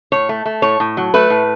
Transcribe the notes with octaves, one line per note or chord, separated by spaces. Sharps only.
A2 C#5
A3
A3
A2 C#5
A2
F#3
A3 B4
A2